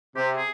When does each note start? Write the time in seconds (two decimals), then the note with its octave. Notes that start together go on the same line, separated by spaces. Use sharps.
0.16 C3 G4
0.37 G#4